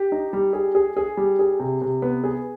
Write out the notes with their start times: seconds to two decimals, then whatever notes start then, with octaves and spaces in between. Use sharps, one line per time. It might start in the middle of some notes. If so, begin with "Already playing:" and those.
Already playing: G4
0.12 D#4
0.33 G3
0.53 G#4
0.75 G#4
0.97 G#4
1.17 G3
1.39 G#4
1.60 C3
1.82 C3
2.02 B3
2.24 G#4